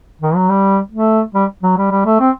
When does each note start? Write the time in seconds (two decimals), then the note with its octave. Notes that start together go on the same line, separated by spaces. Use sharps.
0.22 D#3
0.35 F#3
0.49 G3
0.92 A3
1.35 G3
1.63 F#3
1.78 G3
1.91 G3
2.06 A3
2.20 C4